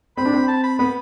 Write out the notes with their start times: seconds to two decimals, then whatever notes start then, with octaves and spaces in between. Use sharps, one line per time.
0.17 C4 B5
0.25 D4
0.34 C4
0.48 A5
0.64 B5
0.79 B3 B5